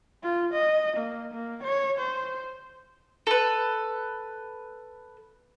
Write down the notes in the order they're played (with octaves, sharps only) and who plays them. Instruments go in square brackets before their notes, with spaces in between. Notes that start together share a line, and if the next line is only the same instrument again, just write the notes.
[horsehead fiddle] F4
D#5
A#3
A#3
C#5
C5
[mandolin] A4 B4